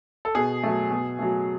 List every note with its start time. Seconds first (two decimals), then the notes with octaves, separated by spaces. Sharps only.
0.25 A4
0.35 B2 G#4
0.63 F#3 A3
0.91 B2
1.19 F#3 A3